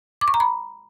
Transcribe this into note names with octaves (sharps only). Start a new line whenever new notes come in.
D6
C#6
A#5
B5